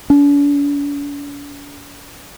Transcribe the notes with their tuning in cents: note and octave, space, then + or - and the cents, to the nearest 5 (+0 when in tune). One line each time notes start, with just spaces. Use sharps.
D4 -45